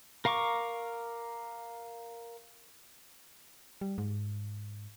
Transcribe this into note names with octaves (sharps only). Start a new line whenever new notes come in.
A#4 F5 A#5 C#6 D6
G3
G#2